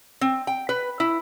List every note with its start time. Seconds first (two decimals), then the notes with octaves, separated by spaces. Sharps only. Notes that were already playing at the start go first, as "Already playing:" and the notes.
0.21 C4
0.47 G5
0.69 B4
1.00 E4